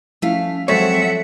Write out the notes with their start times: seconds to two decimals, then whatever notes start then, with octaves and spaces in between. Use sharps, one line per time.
0.22 F3 A3 C#4 E4 F5 B6
0.68 F3 F#3 G#3 C4 A4 C#5 E5 F#5